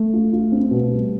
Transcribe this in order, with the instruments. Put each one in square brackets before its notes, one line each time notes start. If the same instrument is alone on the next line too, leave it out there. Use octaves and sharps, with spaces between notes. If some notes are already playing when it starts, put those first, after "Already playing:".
Already playing: [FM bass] A3
[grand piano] F4
F4
C4
B2
G3